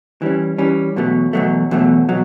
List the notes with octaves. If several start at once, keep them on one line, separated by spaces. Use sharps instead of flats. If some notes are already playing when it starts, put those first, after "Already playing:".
E3 G3 C#4
E3 G3 C#4
E2 B2 F#3 A3
E2 B2 F#3 A3
E2 B2 F#3 A3
B2 F#3